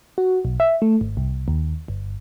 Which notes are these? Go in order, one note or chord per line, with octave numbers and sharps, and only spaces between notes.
F#4
B1
E5
A3
G#1
C2
D#2
G1